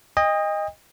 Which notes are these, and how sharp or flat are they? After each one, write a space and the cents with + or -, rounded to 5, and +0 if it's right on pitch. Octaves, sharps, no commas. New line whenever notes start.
D#5 +0 G5 +45